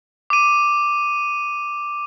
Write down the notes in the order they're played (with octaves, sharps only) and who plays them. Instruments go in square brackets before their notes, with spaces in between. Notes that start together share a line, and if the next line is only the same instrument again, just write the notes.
[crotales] D6 D#7